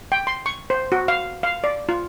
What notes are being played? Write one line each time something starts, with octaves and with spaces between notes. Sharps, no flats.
G5
C6
C#6
C5
F#4
F5
F5
D5
F4